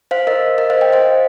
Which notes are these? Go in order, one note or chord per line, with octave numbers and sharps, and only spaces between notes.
C5 F5
A#4 D#5
A#4 D#5
C5 F5
D#5 G5
C5 F5